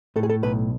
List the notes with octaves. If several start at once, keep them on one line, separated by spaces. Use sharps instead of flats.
A2 A4
G#4
A4
B1 B4